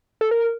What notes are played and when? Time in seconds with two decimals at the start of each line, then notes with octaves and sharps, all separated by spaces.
0.21 A4
0.31 A#4